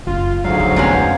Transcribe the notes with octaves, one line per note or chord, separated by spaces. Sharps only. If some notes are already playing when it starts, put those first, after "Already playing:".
F#1 F4
D2 G#2 F#3 D#4 F5
G#1 F2
C3 B3 C#4